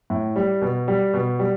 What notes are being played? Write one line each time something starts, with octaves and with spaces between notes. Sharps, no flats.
A2
G3
B2
G3
B2
G3